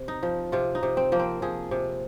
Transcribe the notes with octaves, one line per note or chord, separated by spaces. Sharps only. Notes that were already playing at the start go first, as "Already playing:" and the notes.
Already playing: C3
D#4
F3
C3 F4
D#4
C3
C4
F3 A#3
C4
F3 G#4
C3